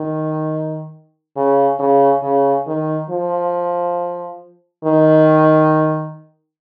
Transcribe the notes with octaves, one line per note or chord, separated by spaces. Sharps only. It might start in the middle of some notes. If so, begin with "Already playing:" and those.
Already playing: D#3
C#3
C#3
C#3
D#3
F3
D#3